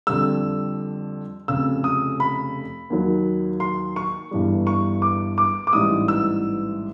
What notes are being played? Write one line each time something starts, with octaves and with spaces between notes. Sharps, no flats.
F2 D3 G3 E6
F1 F2 C#3 E6
D#6
B5
D#2 D#3 F#3
C6
C#6
G1 G2 E3 G3
C#6
D6
D6
D6
A1 G#2 E3 G3 D#6
E6